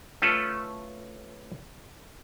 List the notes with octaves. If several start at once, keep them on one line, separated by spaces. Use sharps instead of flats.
A3 C#4 F4 A4 B4